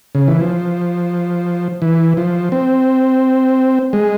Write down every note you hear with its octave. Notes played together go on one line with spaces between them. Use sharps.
C#3
E3
F3
E3
F3
C4
G#3